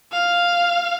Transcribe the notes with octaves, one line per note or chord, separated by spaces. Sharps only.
F5